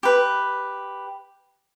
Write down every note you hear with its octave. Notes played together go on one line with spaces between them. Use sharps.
G4 B4